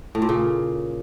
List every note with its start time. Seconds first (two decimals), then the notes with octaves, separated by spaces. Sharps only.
0.15 A2
0.22 A#2
0.29 C#3